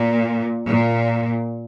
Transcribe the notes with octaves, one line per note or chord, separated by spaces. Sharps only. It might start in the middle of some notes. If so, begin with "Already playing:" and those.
Already playing: A#2
A#2